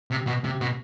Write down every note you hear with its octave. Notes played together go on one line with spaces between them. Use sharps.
C3
B2
C3
B2